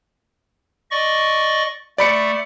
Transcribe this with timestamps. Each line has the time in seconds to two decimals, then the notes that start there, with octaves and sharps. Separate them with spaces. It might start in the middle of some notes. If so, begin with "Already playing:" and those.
0.91 D5 D#5 C#6
1.98 A3 D5 B5 C#7